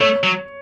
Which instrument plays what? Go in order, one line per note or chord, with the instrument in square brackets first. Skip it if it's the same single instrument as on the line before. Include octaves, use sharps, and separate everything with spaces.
[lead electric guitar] A3 [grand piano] C#5
[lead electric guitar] F#3